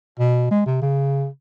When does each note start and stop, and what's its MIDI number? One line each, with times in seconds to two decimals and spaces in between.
0.19 0.49 47
0.51 0.64 56
0.66 0.82 48
0.82 1.27 49